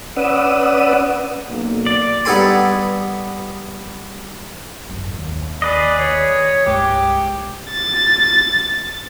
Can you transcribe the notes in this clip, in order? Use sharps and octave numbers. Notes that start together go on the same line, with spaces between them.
C#4 B4 D5 F#5 D#6 E6
B1 A#3
D5
G2 B3 D#4 A4 G#5 C6
D1 G#1 F#2
D#2
G#4 B4 D5 D#5
C#5
C2 G2 G#3 G4
A6